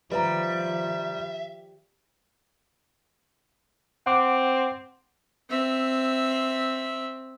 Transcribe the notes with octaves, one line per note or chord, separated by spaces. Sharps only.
D#3 F3 G3 B4 E5 A#5
C4 F#5 D6
C4 E5